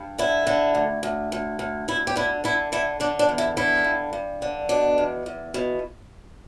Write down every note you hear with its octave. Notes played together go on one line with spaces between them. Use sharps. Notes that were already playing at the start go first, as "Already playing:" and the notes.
Already playing: G2
D3 E4
D3
D2
D2
D2
D2
D2 E4
G4
D3 E4
D3 E4
D3 E4
D3 D4
D4
E2
E4
D3 E4
G2
G2
D3
B2 D4
E2
E2
B2